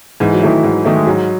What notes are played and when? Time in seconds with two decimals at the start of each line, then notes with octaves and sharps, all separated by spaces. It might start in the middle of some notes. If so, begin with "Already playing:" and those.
0.20 G#2 E3
0.33 F#3
0.42 D#3 E3 A3 E4
0.63 G#2
0.84 D#3 A3 E4
0.96 G#3
1.06 G#2 F#3